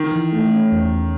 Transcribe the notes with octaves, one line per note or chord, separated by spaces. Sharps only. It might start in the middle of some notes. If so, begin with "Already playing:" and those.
Already playing: D#3
E3
A3
C#4
E2
E2